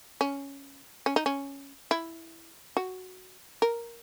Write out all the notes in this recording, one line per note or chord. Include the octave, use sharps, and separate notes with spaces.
C#4
C#4
D#4
C#4
E4
F#4
A#4